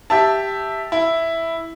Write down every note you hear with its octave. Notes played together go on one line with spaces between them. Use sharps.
G4 E5 A5
E4